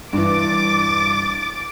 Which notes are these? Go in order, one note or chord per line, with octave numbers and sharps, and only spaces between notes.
G2 E3 D6 A6